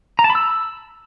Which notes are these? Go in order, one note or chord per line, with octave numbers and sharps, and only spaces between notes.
A#5
A5
B5
E6